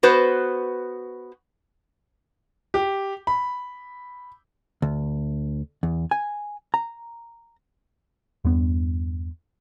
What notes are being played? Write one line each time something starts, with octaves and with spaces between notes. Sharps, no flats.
B3 F#4 B4 C5
G4
B5
D2
E2
G#5
A#5
E2 G2 B3